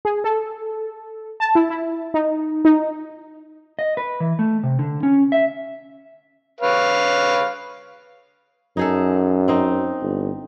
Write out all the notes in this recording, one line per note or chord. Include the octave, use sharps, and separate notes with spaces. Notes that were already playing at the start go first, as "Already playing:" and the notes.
G#4
A4
A5
E4
E4
D#4
D#4
D#5
B4
E3
A3
C3
D3
C#4
E5
B4 C#5 F5
F#2 D#4 G#4 A4
C4 D#4
G1